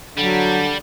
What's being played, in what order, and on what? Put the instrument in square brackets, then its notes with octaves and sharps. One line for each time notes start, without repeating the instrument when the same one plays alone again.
[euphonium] D3 [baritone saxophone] F#3 [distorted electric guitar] G3